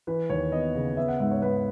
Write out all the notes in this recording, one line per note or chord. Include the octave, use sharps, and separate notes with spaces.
E3 B4
D#2 C#5
B3 D#5
C#3
B3 E5
F#5
G#2 E5
C#5
G#2 B4